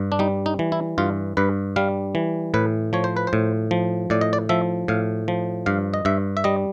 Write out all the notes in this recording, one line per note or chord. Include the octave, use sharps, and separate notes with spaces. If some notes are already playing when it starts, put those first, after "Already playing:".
Already playing: G2
D4
G3 D#4
D#4
E3
E4
G2 F4
G2 B4
G3 F5
E3
A2 B4
F3 C#5
C5
B4
C5
A2
F3
A2 D5
D#5
D5
F3 E5
A2 F5
F3
G2 F5
D#5
G2 E5
E5
G3 D#5